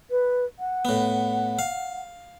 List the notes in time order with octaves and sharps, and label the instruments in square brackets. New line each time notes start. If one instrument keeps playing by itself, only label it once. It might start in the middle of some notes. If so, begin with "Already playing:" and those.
[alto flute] B4
F#5
[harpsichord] A2 B3
F5